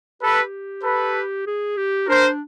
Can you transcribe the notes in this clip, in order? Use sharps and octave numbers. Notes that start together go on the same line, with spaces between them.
G4 A4 B4
A4 B4
G#4
G4
D4 A#4 C5